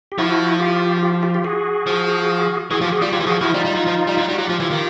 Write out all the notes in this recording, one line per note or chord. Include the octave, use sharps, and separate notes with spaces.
G4
F3 E4 F#4
F4 G4
F4 G4
F4 G4
F4 G4
F#4 G#4
F3
E3 F#4 G#4
F3 F4 G4
F#4 G#4
G3 F4 G4
F#3 F4 G4
E3
F3 F#4 G#4
F3 E4 F#4
G3 D#4 F4
G3
F#3
F3
G3
F#3
G3
F#4
F#3 F4 G4
F3
E3
D#3